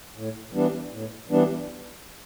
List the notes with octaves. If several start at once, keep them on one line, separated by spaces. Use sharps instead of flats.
A2
E3 G3 B3 D4
A2
E3 G3 B3 D4